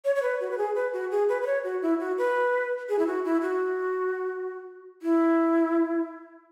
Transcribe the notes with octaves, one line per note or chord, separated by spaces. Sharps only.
C#5
C#5
B4
F#4
B4
G#4
B4
F#4
G#4
B4
B4
C#5
F#4
E4
F#4
B4
G#4
E4
F#4
E4
F#4
E4